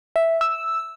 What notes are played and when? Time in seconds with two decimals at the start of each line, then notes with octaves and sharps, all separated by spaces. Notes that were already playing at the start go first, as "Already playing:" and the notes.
0.16 E5
0.41 E6